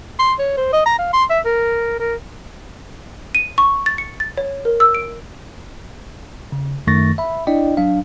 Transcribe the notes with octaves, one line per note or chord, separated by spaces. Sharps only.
C6
C#5
C5
D#5
A#5
F5
C6
E5
A#4
A#4
D#7
C#6
A6
C#7
A6
C#5
A#4
E6
D7
C#3
F#2 D#3 A3 C#6 A6 A#6
E5 B5
D4 E4 D5 D#5 G5
F#3 D4 F5